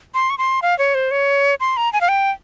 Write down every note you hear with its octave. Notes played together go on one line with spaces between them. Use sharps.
C6
C#6
C6
F5
C#5
C5
C#5
C6
A#5
G#5
F5
G5